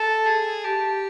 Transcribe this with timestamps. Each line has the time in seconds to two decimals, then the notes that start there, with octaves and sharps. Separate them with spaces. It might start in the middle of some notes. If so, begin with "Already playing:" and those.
Already playing: A4 A5
0.26 G#4
0.64 G4 A5